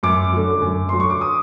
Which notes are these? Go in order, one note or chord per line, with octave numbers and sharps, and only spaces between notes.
F#2 D6
D3 F#3
F#2
D3 F#3 C6
C#6
D6
D#6